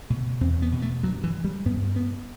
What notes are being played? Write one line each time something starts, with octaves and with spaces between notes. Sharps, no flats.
B2 A3
E2 C4
B3
B2
A3
G2 F#3
E3
G3
G2 B3
B3